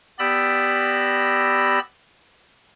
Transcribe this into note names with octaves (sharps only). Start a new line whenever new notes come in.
B3 G4 D5 B5 E6 A#6